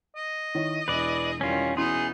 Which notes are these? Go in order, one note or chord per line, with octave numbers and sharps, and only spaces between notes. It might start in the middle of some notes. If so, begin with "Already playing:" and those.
D#5
D#3 E4 C#5
E1 E4 G#4 B4 D5
E2 D#3 G3 C#4 F4
B2 B3 C#4 D#4 E4 G#4 C6